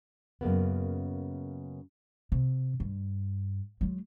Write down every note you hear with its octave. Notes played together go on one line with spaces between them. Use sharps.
F#2 C#3 A#3 B3
C3
G2
F#3 G#3